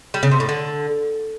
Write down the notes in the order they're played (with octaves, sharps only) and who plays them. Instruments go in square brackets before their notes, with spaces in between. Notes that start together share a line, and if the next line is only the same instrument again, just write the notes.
[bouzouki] G3
C#3
C3
A2
D3